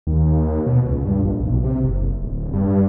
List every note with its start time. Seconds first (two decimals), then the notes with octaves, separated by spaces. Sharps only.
0.07 D#2
0.67 B2
0.87 C#2
1.06 G2
1.25 A#1
1.46 B1
1.64 C3
1.85 F#1
2.22 D1
2.53 G2